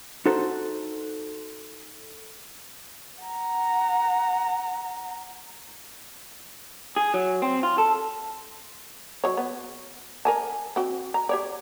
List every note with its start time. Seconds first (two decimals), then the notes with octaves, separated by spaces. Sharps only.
0.26 D#4 F#4 A4 C5
3.22 F#5 A#5
6.96 G#4
7.14 F#3
7.42 C4
7.63 F4
7.78 A4
9.24 F#3 C#5
9.37 B3
10.25 A#4 G#5 A5
10.76 C4 F#4
11.14 A#5
11.29 G4 C#5 D5